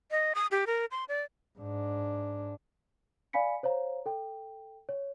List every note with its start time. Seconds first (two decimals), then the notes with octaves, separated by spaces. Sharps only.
0.11 D#5
0.35 D#6
0.51 G4
0.67 A#4
0.91 C6
1.09 D5
1.58 G#2 D4
3.33 D5 F5 G#5 B5 B6 C#7
3.63 C5 C#5 F5 A#5
4.06 A4 G5
4.89 C#5